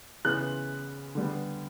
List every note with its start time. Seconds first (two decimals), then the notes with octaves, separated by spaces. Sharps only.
0.24 C#3 E3 B3 F#6
1.15 D3 G3 B3